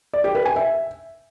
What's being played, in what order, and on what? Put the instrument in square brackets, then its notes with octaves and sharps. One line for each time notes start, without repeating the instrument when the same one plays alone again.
[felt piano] D5
G4
B4
G#5
E5